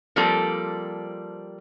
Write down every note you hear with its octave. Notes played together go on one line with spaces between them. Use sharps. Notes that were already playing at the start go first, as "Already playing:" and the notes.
F3 G3 A#3 C4 A4